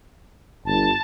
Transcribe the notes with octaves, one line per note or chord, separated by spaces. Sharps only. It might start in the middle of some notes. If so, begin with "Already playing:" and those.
G1 A5